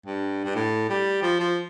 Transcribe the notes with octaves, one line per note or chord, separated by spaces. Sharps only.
G2
G2
A2
G3
F3
F3